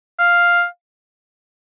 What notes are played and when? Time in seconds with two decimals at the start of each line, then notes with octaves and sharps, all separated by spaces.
0.20 F5